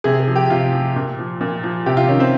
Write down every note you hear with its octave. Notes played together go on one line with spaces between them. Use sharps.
C3 G#4
G#4
F3
G4
C3 F4
F3
A#2
F3
A#2
F3
C3 G4
F4
D#3 C#4
C4